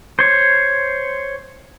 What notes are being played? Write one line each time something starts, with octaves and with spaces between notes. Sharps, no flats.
C5 C#5